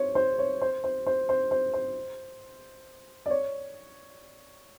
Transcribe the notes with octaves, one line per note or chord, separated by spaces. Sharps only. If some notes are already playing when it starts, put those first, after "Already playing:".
Already playing: C5 C#5
C5
C#5
C5
C5
C5
C5
C5
C5
D5
C#5